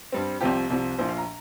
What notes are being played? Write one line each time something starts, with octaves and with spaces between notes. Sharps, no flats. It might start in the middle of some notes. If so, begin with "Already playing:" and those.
G2 G3 C4
C2 C3 F3 G4
C2 C3 F3
A#1 A#2 F3 C5
F5
A#5